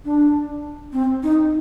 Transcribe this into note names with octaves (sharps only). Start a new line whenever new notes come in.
D4
C4
D#4